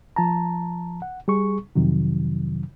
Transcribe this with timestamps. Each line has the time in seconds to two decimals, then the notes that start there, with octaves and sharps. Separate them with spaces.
0.16 F3 A5 A#5
1.02 F#5
1.28 G3 G#4 C#6
1.75 F2 C3 D#3 F#3